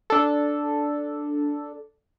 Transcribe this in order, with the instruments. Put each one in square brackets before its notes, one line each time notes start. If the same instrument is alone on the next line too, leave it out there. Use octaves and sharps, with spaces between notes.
[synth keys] D4 A4